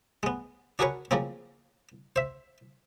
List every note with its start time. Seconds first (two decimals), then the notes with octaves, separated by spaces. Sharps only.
0.23 G#3 B3
0.79 D4 F#4 G#4 A#4 B4 C#5
1.11 C#3 F3 A#3 C4
2.16 C5 E5